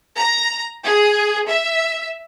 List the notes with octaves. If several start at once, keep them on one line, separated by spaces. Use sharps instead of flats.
A#5
G#4
E5